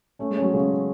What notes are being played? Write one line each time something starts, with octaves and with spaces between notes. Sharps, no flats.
A3 C#4
G#3
C#4
F#3
C#3 G#3
C#4